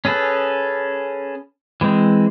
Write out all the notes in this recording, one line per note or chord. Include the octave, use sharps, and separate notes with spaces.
C#4 G#4 A4 B4
E3 G#3 C4